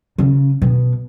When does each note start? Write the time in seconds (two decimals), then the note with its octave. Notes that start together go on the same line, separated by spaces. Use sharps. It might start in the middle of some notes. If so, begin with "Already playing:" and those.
0.18 C#3
0.62 B2